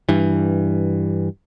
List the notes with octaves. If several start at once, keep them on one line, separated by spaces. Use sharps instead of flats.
G2 E3